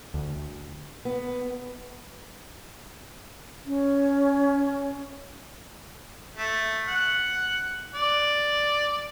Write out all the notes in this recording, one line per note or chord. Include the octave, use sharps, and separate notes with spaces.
D2
B3
C#4
A3
F#5
D5